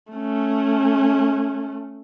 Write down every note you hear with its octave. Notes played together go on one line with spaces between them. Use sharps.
A3 C#4